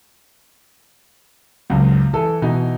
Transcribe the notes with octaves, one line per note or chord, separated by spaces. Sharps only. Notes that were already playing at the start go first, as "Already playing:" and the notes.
C#2 F#2
E3 A4
B2 E3 D#4